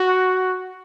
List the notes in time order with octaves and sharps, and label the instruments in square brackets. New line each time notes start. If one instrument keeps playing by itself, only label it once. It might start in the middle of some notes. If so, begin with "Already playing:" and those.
Already playing: [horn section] F#4